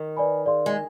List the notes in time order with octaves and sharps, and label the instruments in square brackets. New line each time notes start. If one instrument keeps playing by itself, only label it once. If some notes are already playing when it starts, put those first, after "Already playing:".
Already playing: [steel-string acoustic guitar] D#3
[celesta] B4 D5 G#5 B5
G#4 D5 F5 C6
[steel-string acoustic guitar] G#3